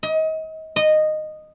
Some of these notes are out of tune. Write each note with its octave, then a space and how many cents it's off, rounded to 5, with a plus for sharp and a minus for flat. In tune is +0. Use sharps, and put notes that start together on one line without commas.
D#5 +30
D#5 -10